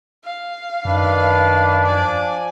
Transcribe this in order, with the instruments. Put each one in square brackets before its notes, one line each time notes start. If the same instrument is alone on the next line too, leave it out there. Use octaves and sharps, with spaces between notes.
[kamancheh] F5
[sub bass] F#2 [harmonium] D#3 B4 [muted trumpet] D4
[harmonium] F3 G#5 [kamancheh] D5